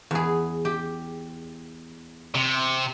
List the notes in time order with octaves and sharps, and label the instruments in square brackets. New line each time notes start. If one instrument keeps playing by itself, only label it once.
[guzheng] E2 G#4
G4
[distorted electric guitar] C3